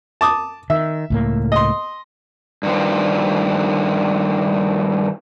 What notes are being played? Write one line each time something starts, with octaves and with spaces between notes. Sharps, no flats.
A5 D6 D#6
D#3 E5
C#2 A2 A#3
D#5 C6
G2 D#3 F3